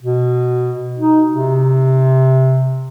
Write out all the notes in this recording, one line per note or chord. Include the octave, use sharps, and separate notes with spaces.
B2
D#4
C3